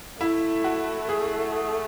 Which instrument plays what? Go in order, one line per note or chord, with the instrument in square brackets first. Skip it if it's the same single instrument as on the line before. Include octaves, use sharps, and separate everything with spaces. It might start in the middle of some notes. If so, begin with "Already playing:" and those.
[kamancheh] A3 [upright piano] E4
[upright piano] F#4
G#4